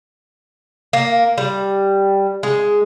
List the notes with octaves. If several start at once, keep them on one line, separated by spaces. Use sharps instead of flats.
A#3
G3
G#3